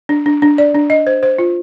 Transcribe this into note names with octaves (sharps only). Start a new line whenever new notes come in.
D4
D4
D4
D5
D4
D#5
C5
C5
F4